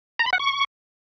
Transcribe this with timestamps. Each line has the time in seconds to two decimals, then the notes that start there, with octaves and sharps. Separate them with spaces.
0.19 A#5
0.26 B5
0.33 F#5
0.39 C#6